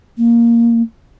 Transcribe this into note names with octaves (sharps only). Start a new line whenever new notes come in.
A#3